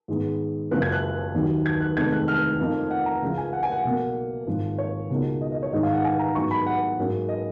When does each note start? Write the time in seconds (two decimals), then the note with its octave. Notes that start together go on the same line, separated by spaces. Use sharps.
0.08 G#2 D#3 G#3 B3
0.71 F#1 F#2 F3 G#3 C#4 F#6
0.82 G#6
0.92 F#6
1.34 D#2 D#3 F#3
1.66 G#6
1.80 F#6
1.96 F1 F2 D#3 G#3 G#6
2.12 F#6
2.28 F6
2.60 F2 F3 A#3 D#4
2.91 F#5
3.06 A#5
3.22 C#2 C#3 F3
3.38 G#5
3.53 F#5
3.63 G#5
3.72 F#5
3.84 B1 B2 A#3
4.47 G#1 G#2 F3 A#3
4.78 C#5
5.10 C#2 B2 A#3 D#4
5.41 D#5
5.52 D#5
5.63 C#5
5.73 G#2 D#3 G#3 D#5
5.83 F5
5.94 F#5
6.04 G#5
6.19 A#5
6.35 G#2 F#3 B3 D#4 C#6
6.51 B5
6.66 F#5
6.98 G#2 F#3 A#3 C#4
7.29 D#5